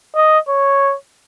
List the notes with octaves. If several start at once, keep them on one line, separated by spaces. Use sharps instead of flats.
D#5
C#5